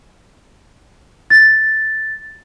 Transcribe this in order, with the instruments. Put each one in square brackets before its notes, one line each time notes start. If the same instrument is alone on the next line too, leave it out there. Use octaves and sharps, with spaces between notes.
[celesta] A6